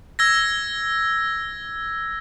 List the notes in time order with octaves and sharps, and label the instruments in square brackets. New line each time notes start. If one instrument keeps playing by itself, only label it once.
[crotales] E6 G#6 A#6